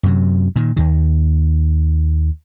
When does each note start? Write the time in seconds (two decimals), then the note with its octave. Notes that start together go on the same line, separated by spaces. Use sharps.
0.03 F#2 C3 F#3
0.56 A#2 D#3
0.77 D#2 D#3